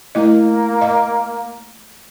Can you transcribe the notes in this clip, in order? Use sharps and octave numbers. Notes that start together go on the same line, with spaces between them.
A3 A#3 E4 D#5
D#5 F5